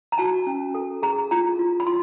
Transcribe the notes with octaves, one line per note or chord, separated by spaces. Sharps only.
A#5
F#4 A5
C#4
A4
G#4 A#5
F4 A#5
F4
B5
F4 C6